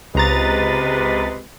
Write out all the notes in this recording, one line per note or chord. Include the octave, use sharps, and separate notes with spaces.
C#2 C3 G#3 B4 A#5 A6